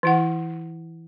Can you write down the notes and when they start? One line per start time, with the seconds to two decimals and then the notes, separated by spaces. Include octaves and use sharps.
0.03 E3 E4 F#5